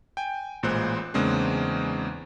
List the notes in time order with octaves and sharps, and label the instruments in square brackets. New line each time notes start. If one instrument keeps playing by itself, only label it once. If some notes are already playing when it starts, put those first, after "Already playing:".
[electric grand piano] G5 G#5
A1 A#2 G#3 C5 F#6
E2 C#3 G#3 A#3 C4 D4